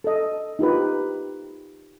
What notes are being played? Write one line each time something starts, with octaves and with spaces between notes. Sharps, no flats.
A4 D#5
D#4 F4 G4 B4